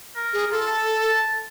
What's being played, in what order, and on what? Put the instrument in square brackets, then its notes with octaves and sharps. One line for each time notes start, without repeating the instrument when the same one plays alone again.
[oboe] A#4
[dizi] G#4
[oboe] F4 [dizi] A4
[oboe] A5